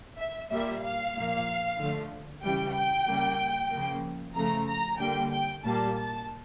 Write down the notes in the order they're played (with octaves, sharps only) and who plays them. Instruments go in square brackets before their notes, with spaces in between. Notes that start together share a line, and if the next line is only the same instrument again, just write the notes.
[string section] E5
A#2 G3 A#3 E5
F5
A#2 F3 A#3
D3 F3 A3
C#3 E3 G3 G5
G5
C#3 G3 A#3
C#3 F3 A#3
C#3 F3 A3 A#5
A#5
D3 G3 A#3 G5
G5
A#2 G3 A#3 A5
A5